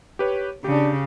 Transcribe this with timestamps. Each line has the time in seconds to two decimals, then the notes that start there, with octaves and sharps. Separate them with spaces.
0.19 G4 B4 C#5
0.64 C#3 D4 G4